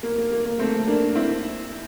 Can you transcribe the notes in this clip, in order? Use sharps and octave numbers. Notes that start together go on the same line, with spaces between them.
A#3
A#3
A#3
A#3
A3 C4
A#3 D4
C4 E4